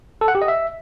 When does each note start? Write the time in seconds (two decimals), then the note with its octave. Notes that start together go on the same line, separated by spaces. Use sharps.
0.21 A4
0.28 F#5
0.35 G4
0.42 D#5
0.48 E5